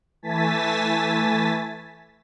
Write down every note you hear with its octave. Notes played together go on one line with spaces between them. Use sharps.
E3 A3 G#5 A5 A6 B6